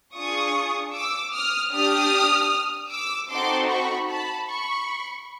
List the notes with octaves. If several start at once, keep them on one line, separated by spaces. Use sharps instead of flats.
D4 F4 G#4 C#6 D#6
D6 E6
D#6 F6
D4 G4 D#6 F6
D6 E6
C4 D#4 F#4 A4 C6 D6
B5 C#6
A5 B5
B5 C#6